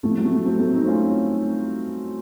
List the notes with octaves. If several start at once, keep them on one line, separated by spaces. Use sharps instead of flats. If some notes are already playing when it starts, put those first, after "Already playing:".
A2 F3 A3
F#3
A3
A3 C4
A3 C4
C4 D#4
C#4 F4